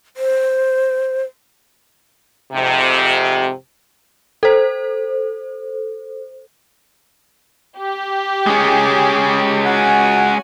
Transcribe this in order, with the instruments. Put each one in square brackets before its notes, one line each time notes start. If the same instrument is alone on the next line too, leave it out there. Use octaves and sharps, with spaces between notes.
[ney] C5
[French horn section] F2 G#2 C3
[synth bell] A4 C5
[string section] G4
[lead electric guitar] G#3 C#4 [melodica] G#4
[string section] F#4 G#5 [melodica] F#5